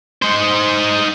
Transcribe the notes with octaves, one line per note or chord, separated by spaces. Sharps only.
D#4 C5